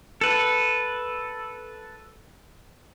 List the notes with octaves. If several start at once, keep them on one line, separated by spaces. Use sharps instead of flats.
A4 B4